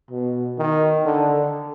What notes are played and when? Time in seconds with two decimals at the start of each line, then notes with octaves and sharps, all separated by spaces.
0.11 B2
0.58 D#3
1.05 D3